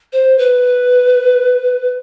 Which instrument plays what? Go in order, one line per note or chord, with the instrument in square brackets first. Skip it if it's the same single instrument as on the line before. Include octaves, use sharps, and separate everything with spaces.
[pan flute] C5
B4